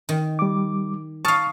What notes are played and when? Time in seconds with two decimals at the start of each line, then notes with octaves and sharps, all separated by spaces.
0.09 D#3
0.39 G3 D6
1.25 F5 A5 C#6 D#6 F6